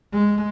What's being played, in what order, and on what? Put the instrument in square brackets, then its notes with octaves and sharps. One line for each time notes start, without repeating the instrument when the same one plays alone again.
[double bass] G#3